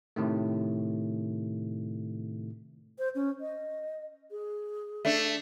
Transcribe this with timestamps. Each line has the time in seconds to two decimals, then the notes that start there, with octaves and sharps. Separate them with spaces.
0.16 A2 C3 D#3 A3
2.99 C5
3.15 C#4
3.41 D#5
4.31 G#4
5.05 A3 D4